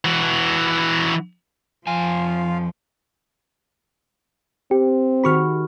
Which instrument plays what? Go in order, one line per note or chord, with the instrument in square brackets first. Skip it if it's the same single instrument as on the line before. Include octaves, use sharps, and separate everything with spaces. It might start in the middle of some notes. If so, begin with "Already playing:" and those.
[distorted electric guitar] E3 F#4
[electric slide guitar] F2 G#5 [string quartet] F3 [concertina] F4 F5
[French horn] C4 [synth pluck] G4
[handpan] D#3 F#4 G#4 [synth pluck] B5 C#6 F6